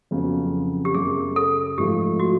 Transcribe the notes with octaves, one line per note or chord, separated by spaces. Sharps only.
F2 C#3 F#3 B3
G4
F#2 C#3 F#3 G#4
A4
G#2 F3 A3 G4
F#4